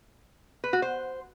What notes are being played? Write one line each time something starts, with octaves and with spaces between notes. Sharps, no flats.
B4
F#4
C5